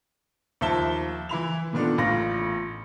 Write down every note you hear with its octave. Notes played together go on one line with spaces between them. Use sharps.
D#2 F3 E5 A5 G7
E3 E4 B5 F7
A#2 D#3 B3 D4 A4
A1 F4 B5 A#6